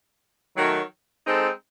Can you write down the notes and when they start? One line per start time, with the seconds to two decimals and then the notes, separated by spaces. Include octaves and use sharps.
0.56 D#3 F#3 A3
1.25 G#3 C4 D#4 A4